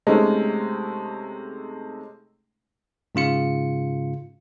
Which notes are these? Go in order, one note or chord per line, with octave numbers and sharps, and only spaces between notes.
C3 G#3 A3 C#4 D#4
G#2 C#3 F4 C#7